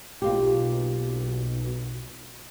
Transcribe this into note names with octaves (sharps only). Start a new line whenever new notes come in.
B1 B2 A#3 F4 G4